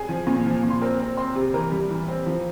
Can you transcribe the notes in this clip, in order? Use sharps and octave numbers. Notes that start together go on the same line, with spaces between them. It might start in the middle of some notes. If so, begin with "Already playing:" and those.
Already playing: G#4 G#5
F3
A#2
F3
A#2
C6
C4 A#4 A#5
C4
C4 C5 C6
C3
E3 A#4 A#5
G3
E3
C4
F3